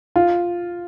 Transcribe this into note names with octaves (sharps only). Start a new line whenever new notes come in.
F4